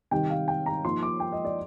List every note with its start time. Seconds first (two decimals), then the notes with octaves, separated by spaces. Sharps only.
0.11 C3 D#3 G3 G5
0.30 F5
0.48 G5
0.66 A#5
0.85 F3 A#3 D#4 C6
1.03 D6
1.20 G5
1.32 D#5
1.45 D5